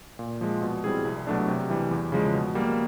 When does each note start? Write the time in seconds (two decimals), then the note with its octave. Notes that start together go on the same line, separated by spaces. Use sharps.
0.19 A#2
0.41 F3 G#3
0.62 B2
0.84 G3 C4 E4 G#4
1.05 C2
1.27 B2 F#3 A3 D4
1.48 C3
1.70 E3 G3
1.91 E2
2.12 C#3 F3 G#3
2.34 B2
2.55 G3 A#3